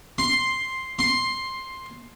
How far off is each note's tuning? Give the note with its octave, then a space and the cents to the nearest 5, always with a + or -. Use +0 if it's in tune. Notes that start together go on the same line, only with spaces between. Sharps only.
C6 +5
C6 +10